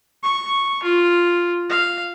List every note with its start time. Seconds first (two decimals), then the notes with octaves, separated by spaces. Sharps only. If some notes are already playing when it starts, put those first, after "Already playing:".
0.23 C#6
0.83 F4
1.69 F5